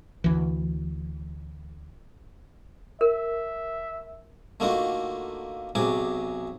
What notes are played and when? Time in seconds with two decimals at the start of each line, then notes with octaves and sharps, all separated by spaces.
0.24 D2 E3
3.01 A#4 E5
4.60 D3 A3 A#3 D#4 F4 F#4
5.75 B1 C3 F#4 G#4 D6